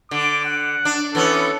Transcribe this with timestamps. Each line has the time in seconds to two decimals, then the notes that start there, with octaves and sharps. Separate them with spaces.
0.11 D3 D6
0.45 F#5
0.85 D4
1.15 E3 B3 C#4 A4